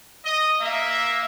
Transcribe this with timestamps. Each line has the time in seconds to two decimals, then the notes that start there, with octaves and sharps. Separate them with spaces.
0.25 D#5
0.61 A#3 E5